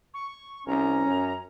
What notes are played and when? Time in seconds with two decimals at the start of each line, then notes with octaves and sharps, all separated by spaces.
0.14 C#6
0.67 C2 C#4 A#5
1.06 F#2